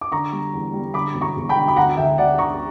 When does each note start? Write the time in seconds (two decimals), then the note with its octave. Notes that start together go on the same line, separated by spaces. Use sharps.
0.01 D6
0.12 D3 A#5 C#6
0.32 G3
0.54 E2
0.74 G3
0.94 D3 B5 D6
1.14 E1
1.21 A#5 C#6
1.36 E1
1.49 G5 B5
1.56 D3
1.68 B5
1.76 D2 F#5 A#5
1.97 D2 E5 G5
2.18 D2 D5 F#5
2.38 D3 A#5 C#6